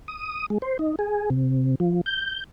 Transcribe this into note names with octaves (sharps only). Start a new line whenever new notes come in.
D#6
G#3
C5
D#4
G#4
C3
F3
G6